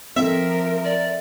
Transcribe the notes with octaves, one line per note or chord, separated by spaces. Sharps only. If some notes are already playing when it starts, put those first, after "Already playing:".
F3 C4 A4 A#4 E5
D5